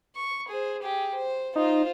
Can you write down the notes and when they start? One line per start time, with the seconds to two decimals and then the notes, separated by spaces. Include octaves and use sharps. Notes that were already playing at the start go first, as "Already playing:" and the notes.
0.16 C#6
0.48 G#4 C5
0.82 G4 G#4
1.15 C5
1.56 D#4 F4 C5